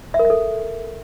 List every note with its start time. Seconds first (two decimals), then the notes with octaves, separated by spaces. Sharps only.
0.14 E5
0.19 A#4
0.25 E5
0.30 A4